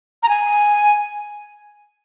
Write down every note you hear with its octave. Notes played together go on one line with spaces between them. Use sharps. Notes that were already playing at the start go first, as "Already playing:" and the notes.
A#5
G#5